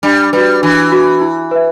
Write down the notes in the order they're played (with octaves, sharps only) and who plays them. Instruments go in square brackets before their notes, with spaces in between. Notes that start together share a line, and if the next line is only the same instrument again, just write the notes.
[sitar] G3 [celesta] D4
[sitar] G3 [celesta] F#4 B4
[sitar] E3 [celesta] D4
[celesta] F#4 B4
E4
B4 E5